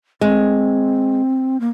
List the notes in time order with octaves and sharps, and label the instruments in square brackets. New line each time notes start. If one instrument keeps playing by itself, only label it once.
[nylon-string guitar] G#3 [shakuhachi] C4
[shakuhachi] A#3